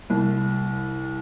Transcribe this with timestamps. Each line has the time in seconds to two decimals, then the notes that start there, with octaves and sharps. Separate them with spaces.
0.10 C2